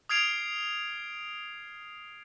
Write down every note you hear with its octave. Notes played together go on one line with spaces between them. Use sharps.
D#6 F6 G#6 C7 D7 F7